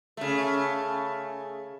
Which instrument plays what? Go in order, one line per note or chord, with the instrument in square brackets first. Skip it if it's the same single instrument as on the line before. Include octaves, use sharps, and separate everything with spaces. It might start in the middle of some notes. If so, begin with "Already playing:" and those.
[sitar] C#3 A3